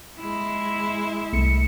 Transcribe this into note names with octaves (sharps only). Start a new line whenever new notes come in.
G#3 E4
C2 A3 C#7